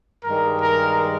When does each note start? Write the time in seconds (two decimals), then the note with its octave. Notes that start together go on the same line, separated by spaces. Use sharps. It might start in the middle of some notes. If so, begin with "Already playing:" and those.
0.23 G2 D#3 G#3 A#4
0.62 A#4